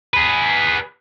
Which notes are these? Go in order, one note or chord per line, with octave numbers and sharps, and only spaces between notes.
G#4 B4